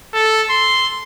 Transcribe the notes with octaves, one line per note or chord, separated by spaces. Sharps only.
A4
C6